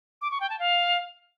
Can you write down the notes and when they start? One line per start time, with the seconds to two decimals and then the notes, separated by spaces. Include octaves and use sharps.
0.22 D6
0.31 C#6
0.40 G5
0.50 A5
0.59 F5